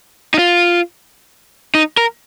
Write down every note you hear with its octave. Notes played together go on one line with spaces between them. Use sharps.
D#4
F4
D#4
A#4